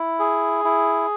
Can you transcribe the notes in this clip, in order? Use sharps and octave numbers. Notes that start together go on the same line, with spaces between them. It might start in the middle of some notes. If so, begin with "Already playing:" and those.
Already playing: E4
G#4
E4